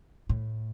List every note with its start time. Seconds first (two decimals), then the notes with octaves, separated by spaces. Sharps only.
0.29 A2